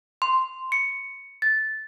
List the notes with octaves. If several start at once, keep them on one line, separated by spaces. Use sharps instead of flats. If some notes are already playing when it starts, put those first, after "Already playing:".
C6
C#7
A6